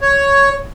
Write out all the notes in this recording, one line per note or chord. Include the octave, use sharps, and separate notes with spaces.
C#5